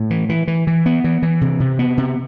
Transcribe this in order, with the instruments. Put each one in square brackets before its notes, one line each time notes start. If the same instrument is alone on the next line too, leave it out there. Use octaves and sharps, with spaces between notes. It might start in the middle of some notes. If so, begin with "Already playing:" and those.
Already playing: [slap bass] A2
E3
E3
E3
E3
B3
E3
E3
C3
C3
B3
C3